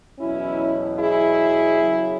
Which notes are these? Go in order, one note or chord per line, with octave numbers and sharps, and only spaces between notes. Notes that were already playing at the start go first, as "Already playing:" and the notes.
E2 B2 F#3 C#4 E4
E4 G#4
F#2 C#3 F#3